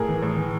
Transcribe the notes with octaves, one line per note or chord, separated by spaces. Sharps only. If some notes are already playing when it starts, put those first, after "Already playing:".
Already playing: A2 G#4 A#4
E3
A2
E3